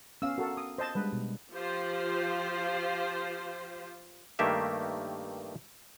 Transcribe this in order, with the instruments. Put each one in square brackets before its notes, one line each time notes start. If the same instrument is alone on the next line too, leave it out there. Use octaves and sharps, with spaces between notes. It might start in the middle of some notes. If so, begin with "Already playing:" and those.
[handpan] B3 F5 [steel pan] C#4 E6
[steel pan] F#4 A4 [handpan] A#4
[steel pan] D#6
C5 D#5 A5
[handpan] G3 G#3 D4 [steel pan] B4
[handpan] B2
[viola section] F3 F4 G4 C5
[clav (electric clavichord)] G2 D#3 A3 A#3 G4 E5